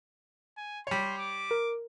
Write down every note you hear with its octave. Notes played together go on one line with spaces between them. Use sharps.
G#5
G3 C#5 C6
D6
A#4